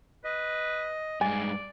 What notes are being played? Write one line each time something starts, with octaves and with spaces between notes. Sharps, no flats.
B4 D#5
G2 G#3 D5 G#5